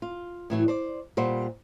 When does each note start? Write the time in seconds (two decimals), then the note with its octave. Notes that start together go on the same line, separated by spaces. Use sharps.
0.02 F4
0.50 A2 E3 F#3
0.68 C5 D5
1.17 A#2 G3 C5 F#5